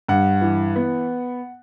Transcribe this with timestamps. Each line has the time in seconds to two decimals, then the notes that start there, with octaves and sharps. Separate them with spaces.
0.09 G2 F#5
0.41 E3
0.76 B3